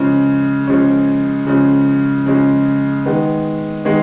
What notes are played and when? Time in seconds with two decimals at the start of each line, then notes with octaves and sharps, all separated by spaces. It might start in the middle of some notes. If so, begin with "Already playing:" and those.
Already playing: C#3 F3 G#3 C#4
0.67 C#3 F3 G#3 C#4
1.47 C#3 F3 G#3 C#4
2.26 C#3 F3 G#3 C#4
3.06 D#3 G#3 B3
3.85 D#3 G#3 B3